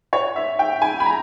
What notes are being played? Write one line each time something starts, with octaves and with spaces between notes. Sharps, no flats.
C#5
E5
G5
G#5
B5
A#5